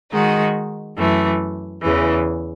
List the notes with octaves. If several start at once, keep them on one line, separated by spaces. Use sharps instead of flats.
D#3 G#3 D#4 F#4
F#2 E3 A3
E2 C#3 E3